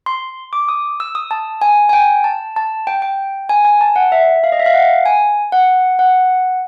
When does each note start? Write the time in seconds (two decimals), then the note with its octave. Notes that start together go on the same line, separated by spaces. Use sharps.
0.06 C6
0.53 D6
0.69 D#6
1.00 E6
1.15 D#6
1.31 A5
1.62 G#5
1.89 G#5
1.93 G5
2.24 A5
2.56 A5
2.87 G5
3.02 G5
3.49 G#5
3.65 G#5
3.81 A5
3.96 F#5
4.12 E5
4.44 F5
4.52 D#5
4.60 E5
4.66 F5
4.74 F#5
5.05 G#5
5.52 F#5
5.99 F#5